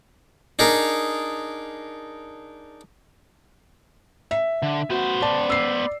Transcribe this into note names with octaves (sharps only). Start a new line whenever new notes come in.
D4 D#4 G#4 A#4
E5
D3
B3 F#4 C5
D5 A5
E6 C7